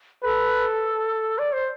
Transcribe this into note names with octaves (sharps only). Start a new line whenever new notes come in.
A4 B4
D5
C5